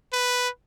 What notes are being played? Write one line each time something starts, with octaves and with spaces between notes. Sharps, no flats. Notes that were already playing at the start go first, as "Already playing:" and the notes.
B4